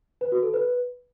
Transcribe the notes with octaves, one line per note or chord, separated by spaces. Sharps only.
B4
F#4
A4
B4